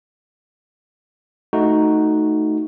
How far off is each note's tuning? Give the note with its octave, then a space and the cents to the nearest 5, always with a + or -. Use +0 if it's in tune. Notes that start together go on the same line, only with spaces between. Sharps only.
A3 +0 D#4 +0 F#4 +0